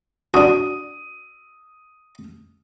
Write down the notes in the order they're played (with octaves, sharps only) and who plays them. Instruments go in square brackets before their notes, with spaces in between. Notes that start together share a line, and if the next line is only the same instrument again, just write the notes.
[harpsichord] D4 F#4 [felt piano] D#6